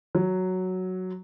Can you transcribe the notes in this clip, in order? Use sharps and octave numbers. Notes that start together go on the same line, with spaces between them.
F#3